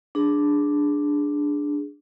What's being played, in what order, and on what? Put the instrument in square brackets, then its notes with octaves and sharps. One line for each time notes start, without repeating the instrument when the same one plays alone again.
[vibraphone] D4 G#4